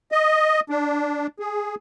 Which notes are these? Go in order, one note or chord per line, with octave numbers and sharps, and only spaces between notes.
D#5
D4
G#4